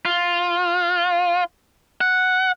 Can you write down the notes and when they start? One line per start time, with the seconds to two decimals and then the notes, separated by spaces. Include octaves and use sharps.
0.05 F4
2.01 F#5